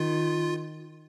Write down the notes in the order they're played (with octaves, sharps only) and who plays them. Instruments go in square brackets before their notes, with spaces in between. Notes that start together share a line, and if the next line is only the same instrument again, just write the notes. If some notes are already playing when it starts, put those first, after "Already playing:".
Already playing: [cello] D#3 [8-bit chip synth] F4